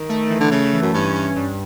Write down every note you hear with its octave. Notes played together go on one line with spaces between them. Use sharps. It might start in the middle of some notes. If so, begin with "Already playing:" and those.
Already playing: D#3
A3
E3
D3
C#3 A3
E3
F#2
G2 C#4
C#4
G2